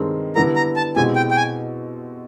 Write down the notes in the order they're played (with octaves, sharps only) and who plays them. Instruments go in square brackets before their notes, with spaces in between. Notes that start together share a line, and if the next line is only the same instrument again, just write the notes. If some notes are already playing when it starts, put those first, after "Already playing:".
Already playing: [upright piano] G2 D#3 G#3 C4
[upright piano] D3 G3 B3 E4 [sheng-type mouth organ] A#5
[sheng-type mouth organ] A#5
A5
[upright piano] B2 G#3 C4 E4 G4 [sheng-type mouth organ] G#5
[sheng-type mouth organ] G5
G5
G#5